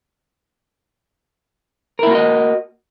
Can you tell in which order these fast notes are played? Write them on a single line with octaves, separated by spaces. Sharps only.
A#4 E4 A#3 F#4 D#5